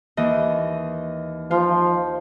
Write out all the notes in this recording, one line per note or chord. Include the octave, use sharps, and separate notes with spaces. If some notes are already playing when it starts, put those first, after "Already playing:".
D#2 E3 D#5
F3 F4